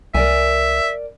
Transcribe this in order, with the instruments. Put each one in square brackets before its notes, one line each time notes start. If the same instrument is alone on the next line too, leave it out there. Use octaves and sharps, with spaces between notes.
[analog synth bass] C2 [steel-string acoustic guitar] A#4 D5 G#5 [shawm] E5